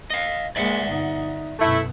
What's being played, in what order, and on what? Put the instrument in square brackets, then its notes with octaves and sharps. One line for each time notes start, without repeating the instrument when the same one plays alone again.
[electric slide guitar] D#5 F5
[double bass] G#3 A#3 [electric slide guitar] D5 E5 F#5
[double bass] G1 D#4
[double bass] F#2 B2 [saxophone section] A3 E4